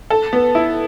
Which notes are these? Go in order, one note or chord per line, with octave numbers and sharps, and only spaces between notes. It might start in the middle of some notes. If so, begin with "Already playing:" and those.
A4
B3
E4